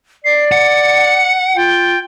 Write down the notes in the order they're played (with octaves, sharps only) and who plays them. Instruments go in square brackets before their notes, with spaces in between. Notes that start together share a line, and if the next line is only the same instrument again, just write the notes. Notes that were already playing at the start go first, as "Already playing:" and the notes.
[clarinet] D5 [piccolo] C7
[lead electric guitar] F#5 [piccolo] C#7
[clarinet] F4 [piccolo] G5